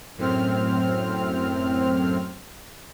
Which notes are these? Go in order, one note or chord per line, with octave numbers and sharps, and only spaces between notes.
F#2 A2 C4 F6